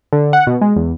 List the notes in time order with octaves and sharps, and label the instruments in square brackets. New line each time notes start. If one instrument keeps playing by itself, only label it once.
[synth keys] D3
F#5
B2
G#3
E2